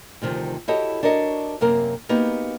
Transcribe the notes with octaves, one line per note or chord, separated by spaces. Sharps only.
D2 C3 D#3 F3
E4 F#4 G4 A4 C#5 D#5
D4 F#4 A#4 C#5 D#5
F#2 C3 A#3 A#4
A#3 B3 D#4 F#4 G4